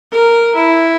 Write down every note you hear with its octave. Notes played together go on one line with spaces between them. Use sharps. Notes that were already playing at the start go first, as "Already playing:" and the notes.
A#4
E4